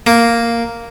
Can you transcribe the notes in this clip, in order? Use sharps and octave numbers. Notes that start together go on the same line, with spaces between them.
A#3